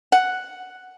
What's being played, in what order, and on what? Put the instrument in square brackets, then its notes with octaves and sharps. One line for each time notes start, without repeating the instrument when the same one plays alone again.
[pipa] F#5